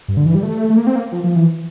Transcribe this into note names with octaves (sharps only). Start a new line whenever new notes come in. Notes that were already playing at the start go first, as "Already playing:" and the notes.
G2
D3
E3
G3
A3
A3
A#3
C4
A#3
F3
F3
E3